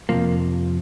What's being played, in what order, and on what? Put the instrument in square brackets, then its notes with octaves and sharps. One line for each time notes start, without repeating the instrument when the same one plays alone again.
[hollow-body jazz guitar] F2 C3 F3 A#3